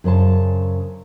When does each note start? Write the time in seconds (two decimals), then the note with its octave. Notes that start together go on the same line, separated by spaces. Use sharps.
0.04 F#2 C#3 C5 A5